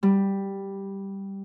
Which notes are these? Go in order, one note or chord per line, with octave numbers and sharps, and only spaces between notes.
G3